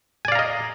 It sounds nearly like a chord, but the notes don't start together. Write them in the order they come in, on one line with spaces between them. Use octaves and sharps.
G#5 D5 F5 A#5 D#5